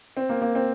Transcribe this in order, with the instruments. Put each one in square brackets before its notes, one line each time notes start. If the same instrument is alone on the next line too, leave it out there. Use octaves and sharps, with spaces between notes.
[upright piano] C4
A#3
A#3
C4